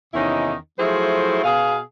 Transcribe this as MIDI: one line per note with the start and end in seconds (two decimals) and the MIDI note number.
0.14 0.55 40
0.14 0.55 48
0.14 0.55 51
0.14 0.55 61
0.14 0.55 63
0.14 0.55 64
0.79 1.42 53
0.79 1.42 54
0.79 1.42 57
0.79 1.42 64
0.79 1.42 68
0.79 1.42 72
1.44 1.79 47
1.44 1.79 68
1.44 1.79 77